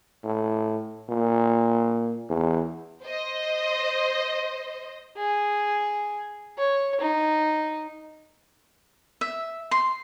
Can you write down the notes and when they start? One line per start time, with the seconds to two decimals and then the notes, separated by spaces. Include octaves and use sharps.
0.24 A2
1.09 A#2
2.29 E2
3.04 C5 D#5
5.17 G#4
6.58 C#5
7.01 D#4
9.21 E5
9.71 C6